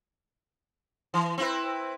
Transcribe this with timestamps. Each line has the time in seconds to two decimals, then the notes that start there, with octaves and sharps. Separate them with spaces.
1.14 E3
1.38 C4 E4 B4